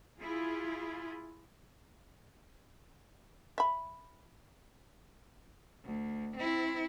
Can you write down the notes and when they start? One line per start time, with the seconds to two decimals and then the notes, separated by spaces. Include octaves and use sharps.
0.19 E4 F4 G#4
3.58 E5 B5
5.85 D2
6.37 C4 E4